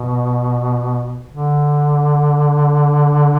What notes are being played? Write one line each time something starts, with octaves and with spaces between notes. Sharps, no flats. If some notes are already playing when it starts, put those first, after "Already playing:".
Already playing: B2
D3